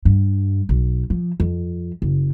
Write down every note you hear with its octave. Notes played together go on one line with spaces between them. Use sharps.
G2
B1
F3
F2
F#1